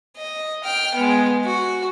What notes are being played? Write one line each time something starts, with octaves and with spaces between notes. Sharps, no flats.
D#5
G5 F6
G#3 B3
F#4